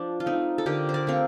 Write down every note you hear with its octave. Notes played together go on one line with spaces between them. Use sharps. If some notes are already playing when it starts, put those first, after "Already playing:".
Already playing: F3 D4
F4
A3 C4 D#4
A4
D3 G4 A#4
C5
A#4 D5
A3 C4 F5